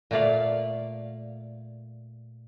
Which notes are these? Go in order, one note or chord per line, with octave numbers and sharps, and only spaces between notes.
A#2 A3 D5 F5